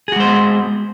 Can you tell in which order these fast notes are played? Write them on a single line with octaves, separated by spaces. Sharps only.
G#4 F#4 G#3 C5 B3